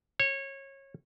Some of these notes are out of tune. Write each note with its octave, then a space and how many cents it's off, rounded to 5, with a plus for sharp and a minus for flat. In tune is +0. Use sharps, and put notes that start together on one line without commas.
C#5 -25